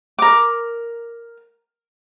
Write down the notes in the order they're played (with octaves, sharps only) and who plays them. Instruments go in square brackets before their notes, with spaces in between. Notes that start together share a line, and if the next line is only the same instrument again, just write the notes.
[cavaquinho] A#4 D6